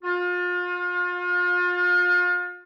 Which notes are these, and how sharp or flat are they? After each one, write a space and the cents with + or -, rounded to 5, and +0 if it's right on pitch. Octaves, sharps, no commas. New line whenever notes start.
F4 +35